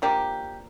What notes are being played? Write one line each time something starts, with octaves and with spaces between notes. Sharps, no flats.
F3 A#3 D4 G4